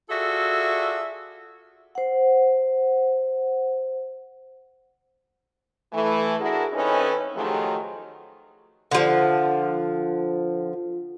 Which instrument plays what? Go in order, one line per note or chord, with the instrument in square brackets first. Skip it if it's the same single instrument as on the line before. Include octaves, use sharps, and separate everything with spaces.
[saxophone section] F4 F#4 G#4 A4 D5 E5
[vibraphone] C5 F#5
[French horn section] E3 A3
D4 E4 F#4 G#4 A#4
E3 C4 C#4 D#4 A4 B4
D#3 F3 F#3 A3 G4 G#4
[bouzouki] D3 F3